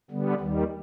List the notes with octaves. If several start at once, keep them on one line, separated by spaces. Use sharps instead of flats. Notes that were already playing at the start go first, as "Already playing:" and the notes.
D3 G3 B3
D#2 D#3 G3